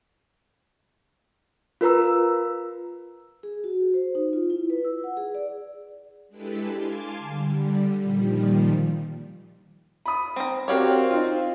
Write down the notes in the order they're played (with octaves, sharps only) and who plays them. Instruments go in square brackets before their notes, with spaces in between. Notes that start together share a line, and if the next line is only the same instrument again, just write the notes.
[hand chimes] F4 A#4 B4 A#5 E6
[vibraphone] G#4
F#4
C5
D#4
F4
E4
B4
E6
F#5
G#4
D5
[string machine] G#3 D4 E4 G4 A4 B4
F5 G#5 A5 C6 D6
D3 G3
A#2 D#3 F3 G3
[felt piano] B5 D#6
[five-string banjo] C4 A#5
[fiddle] C4 [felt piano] F#4 G4 A#4 [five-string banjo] C#5 D5 F5
[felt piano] D#4 F4